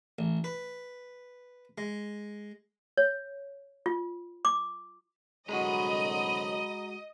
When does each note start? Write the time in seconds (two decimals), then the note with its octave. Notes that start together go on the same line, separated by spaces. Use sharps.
0.19 A1
0.44 B4
1.78 G#3
2.97 C#5
3.86 F4
4.45 D6
5.49 C2 D3 F#3 G#3 F#4 D#5 A#5 B5